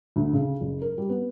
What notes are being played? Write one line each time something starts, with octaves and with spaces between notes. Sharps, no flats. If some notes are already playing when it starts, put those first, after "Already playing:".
D2
C#3
F#1
A#4
G3
B3